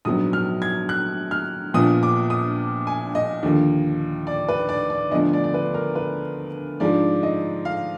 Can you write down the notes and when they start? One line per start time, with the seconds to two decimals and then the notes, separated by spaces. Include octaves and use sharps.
0.05 A#1 G#2 F#3 B3 D#6
0.33 F6
0.62 G#6
0.89 F#6
1.31 F6
1.74 A#1 A#2 F3 B3 D#6
2.03 D6
2.30 D#6
2.87 G#5
3.15 D#5
3.43 D#2 D3 F3
4.27 D5
4.48 B4
4.69 D5
4.90 D5
5.11 D2 D3 F3 B3 D4 D#5
5.33 D5
5.44 D5
5.54 B4
5.74 A#4
5.95 B4
6.80 G#2 F3 G#3 D4 D5
7.23 D#5
7.65 F5